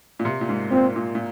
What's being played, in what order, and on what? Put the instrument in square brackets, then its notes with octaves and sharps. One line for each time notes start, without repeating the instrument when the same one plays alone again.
[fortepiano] A#2
C3
A#2
G#2
[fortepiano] A#2 [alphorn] C4
[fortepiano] A#2
A#2